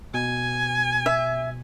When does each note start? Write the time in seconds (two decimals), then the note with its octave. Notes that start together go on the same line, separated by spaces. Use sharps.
0.14 B2 G#5
1.06 E5